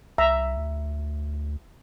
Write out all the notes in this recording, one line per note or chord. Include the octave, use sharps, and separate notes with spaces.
C2 E5 A#5
D2